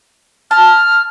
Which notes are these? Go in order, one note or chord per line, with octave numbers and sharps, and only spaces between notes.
A5 F6